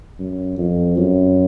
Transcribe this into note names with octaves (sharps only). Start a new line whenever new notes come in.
F#2
F2
F#2